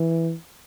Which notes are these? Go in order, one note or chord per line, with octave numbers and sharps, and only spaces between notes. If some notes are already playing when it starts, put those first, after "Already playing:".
Already playing: E3